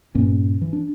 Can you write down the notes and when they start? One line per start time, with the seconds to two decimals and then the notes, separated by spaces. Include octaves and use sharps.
0.15 G2 A#2 A#3 C#4
0.61 E3
0.73 D4